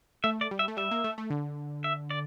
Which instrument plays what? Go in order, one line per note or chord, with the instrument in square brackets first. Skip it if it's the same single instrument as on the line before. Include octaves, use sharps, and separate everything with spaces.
[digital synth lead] A3 [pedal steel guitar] E5
[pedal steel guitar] D5
[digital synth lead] G3
[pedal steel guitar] E5
[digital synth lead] A3
[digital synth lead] G3 [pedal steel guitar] E5
[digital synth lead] A#3
A3
A3
D3
[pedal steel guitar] E5
D5